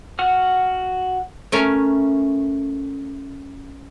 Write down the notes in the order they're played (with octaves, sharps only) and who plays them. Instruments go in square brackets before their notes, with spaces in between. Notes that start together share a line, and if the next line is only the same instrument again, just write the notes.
[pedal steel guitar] F#4 F#5 F6
[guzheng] A3 C#4 A#4